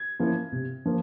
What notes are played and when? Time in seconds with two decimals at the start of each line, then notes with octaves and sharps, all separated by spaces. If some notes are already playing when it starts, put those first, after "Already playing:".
Already playing: G#6
0.19 F3 A#3 C#4 E4
0.52 C3
0.86 F3 A#3